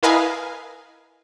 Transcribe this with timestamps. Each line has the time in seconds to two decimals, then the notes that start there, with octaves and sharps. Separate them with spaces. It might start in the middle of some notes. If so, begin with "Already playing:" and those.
0.03 E4 A#4 B4 D#5 F5 G#5